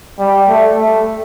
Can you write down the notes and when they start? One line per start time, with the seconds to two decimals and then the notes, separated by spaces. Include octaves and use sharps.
0.19 G3
0.48 A3
0.78 A3